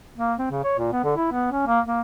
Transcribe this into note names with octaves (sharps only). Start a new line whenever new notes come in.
A#3
C4
C#3
C#5
A#2
B3
D3
E4
B3
C#4
A#3
A#3